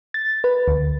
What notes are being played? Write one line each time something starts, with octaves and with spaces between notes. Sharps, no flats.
A6
B4
D2